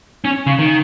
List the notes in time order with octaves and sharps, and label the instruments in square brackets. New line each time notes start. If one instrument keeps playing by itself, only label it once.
[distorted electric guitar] C#4
C#3
D#3